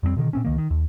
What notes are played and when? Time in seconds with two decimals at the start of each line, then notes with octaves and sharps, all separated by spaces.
0.03 F2 G3 G#3 C4
0.16 B2 D3 D#3
0.33 A#2 C4 C#4
0.45 C#2 D#3 A#3
0.58 D#3
0.70 D#2